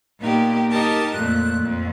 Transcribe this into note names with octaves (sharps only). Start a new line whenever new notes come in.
A#2 A#3 B3 D#4 G4
D#4 G4 A#4 D#5 A5
F2 A#2 A3 F#6
F2